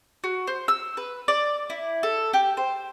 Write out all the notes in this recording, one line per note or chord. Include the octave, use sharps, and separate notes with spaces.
F#4
C5
E6
B4
D5
E4
A4
G4
C5